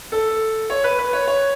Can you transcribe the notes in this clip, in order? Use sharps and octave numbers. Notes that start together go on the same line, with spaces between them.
A4
C#5
B4
B4
C#5
C#5